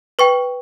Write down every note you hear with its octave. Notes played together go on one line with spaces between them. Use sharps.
B4 G5 C#6